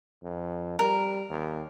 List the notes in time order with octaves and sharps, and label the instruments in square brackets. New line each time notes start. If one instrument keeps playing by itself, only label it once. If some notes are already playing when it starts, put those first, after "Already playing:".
[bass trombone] F2
[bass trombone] G3 [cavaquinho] A#4
[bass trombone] D#2